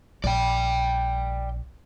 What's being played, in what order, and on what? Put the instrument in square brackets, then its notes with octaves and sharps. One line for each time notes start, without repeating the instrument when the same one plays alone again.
[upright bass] A#1 [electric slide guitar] D5 G5